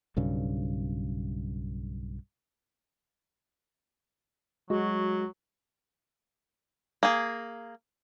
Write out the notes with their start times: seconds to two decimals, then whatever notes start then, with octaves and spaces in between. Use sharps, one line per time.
0.17 B1 G2 C#3
4.70 F#3 G#3 F#4
7.03 A#3 G#4